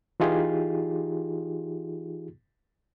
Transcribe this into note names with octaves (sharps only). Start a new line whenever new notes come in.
E3 D#4 F4 G4 G#4